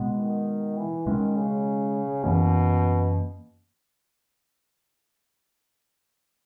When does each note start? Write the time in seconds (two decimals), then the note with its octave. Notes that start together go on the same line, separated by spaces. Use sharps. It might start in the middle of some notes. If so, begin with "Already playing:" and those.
Already playing: B2 G#3 B3
0.18 D#3
0.77 E3
1.06 B2 D#3 G#3 C#4
1.36 C#3
2.23 F#2 B2 E3 A#3 C#4